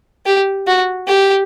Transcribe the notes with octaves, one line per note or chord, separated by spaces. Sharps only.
G4
F#4
G4